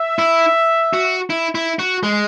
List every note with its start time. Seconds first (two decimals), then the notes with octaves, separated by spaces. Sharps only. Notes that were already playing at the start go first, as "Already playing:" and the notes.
Already playing: E5
0.19 E4
0.93 F#4
1.30 E4
1.55 E4
1.79 F#4
2.03 G#3